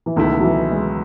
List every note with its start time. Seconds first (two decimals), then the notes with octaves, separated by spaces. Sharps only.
0.06 E3
0.16 C#2 B2 D#3 A3 E4
0.39 F#3
0.43 E3
0.71 G#3